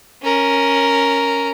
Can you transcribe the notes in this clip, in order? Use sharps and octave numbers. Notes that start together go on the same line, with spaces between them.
C#4 A#4